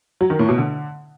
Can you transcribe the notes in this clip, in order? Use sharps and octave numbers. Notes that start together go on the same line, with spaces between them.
F#3
D#3
A2
B2
D3